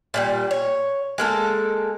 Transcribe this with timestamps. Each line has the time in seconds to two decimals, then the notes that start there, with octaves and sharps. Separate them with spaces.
0.14 A#2 D3 G3
0.51 C#5
1.18 G#3 A#3 A4